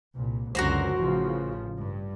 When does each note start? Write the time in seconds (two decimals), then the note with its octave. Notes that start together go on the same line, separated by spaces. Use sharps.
0.15 C2 A#2
0.55 C#2 F#2 D3 F#4 A#4 C5
0.99 A1 C#3 F3
1.78 G2